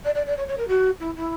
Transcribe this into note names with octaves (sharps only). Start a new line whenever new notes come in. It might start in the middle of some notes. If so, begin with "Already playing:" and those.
D5
D5
D5
C#5
C#5
A#4
F#4
E4
E4